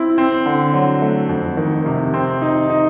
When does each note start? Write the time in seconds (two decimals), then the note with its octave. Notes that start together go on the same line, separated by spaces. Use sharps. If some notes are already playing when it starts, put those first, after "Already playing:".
Already playing: C4 E4
0.18 C4
0.46 D3
0.74 F#3
1.02 A3
1.29 F2
1.57 D#3
1.86 C3
2.14 C4
2.42 D#4
2.70 D#4